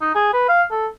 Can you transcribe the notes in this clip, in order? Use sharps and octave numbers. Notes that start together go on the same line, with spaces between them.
D#4
G#4
B4
F5
A4